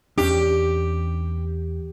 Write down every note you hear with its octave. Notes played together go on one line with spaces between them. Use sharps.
E2 C#4 D4 G4